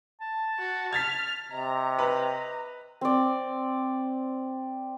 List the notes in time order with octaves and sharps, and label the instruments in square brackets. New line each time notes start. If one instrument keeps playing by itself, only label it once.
[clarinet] A5
[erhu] F#4
[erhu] F6 [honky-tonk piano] G#6 A6 B6
[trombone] C3 [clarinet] D#5 [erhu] A#5
[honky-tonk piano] B4
[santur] C4 D5